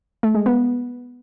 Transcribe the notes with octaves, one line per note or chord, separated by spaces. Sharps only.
A3
G#3
B3